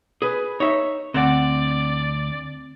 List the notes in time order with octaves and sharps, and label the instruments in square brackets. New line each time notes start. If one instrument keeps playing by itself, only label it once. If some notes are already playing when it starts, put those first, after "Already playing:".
[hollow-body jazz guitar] G#4 B4
[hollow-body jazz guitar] D#4 E5 [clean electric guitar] C#5
[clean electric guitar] D2 F#5 [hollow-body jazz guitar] C4 [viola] D5